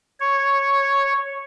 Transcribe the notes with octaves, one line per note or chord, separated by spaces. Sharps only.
C#5